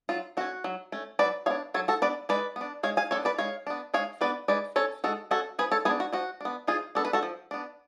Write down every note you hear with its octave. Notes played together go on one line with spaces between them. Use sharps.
F#3 F4
A3 C#4 F#4
F#3
A3 C#4
F#3 B4 D5
B3 D4 C#5 F5
F#3 A4 C#5
F#4 A4
B3 D4 B4 D5
G#3 B4 D5
B3 D4
G#3 C#5 F5
F5 G#5
B3 D4 A4 C#5
B4 D5
G#3 C#5 F5
B3 D4
G#3 C#5 F5
B3 D4 B4 D5
G#3 B4 D5
C#4 A4 C#5
G#3 F#4 A4
C#4 F#4 A4
F3 G#4 B4
A4 C#5
B3 D4 G#4 B4
F#4
F3 F#4
B3 D4
F3 F4 G#4
B3 D4 A4
B4
F#4 A4
F3
B3 D4